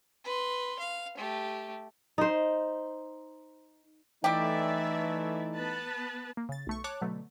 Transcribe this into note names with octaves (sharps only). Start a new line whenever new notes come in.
B4 C6
F5
A3 G4
D#4 C5
E3 G3 A3 D#4 G4 D5 E5
B3 B4 A5
A#3
C#3 A6
B1 A3 C#6
C#5 A5 D6 F#6
B2 D3 F#3 A3